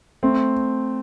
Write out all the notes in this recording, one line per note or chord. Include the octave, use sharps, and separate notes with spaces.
A3 C4